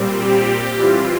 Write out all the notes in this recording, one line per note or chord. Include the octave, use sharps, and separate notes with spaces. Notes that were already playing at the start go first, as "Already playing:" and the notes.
Already playing: A#2 G3 C4
G4
E3 G3 C4 F4